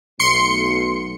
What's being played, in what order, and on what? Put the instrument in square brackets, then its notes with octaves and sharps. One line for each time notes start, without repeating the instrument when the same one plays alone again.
[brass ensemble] B1 A3 [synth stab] C6 C#7